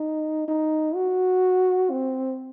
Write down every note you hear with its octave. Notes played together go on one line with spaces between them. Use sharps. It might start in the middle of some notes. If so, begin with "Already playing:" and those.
Already playing: D#4
D#4
F#4
C4